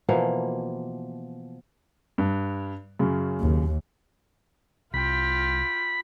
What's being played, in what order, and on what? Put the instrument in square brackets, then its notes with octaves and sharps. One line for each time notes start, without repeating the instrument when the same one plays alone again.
[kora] B2 E3 F3 A#3
[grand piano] G2
F#2 C#3
[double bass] D#2
[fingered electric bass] C2 [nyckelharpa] F4 G5 [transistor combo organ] B5